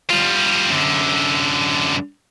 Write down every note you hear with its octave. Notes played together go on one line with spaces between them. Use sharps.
G3 F4
F#2 D3